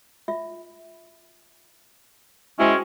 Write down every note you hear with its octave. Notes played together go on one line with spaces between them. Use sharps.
F4 E5
G#3 C#4 E4 F#4 C5 G5